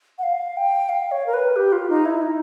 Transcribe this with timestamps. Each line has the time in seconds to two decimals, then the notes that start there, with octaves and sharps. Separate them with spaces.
0.18 F#5
0.23 F5
0.57 G5
0.89 F5
1.12 C#5
1.26 A#4
1.34 B4
1.56 G4
1.72 F4
1.89 D#4
2.05 E4
2.22 D#4